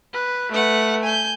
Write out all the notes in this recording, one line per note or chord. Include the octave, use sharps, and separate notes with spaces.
B4
A3 B4 F#5
G#5 G6